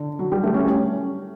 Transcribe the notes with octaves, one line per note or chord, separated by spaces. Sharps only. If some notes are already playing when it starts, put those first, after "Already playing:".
Already playing: D3
F#3
G3
A3
C#4